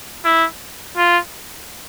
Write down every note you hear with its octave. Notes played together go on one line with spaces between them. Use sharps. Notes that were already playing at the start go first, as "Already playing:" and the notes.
E4
F4